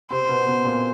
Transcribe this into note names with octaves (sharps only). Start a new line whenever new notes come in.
C3 C4 C5
B2 B3
B2 B3
A#2 A#3